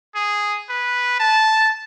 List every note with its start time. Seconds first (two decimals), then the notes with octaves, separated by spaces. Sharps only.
0.15 G#4
0.70 B4
1.20 A5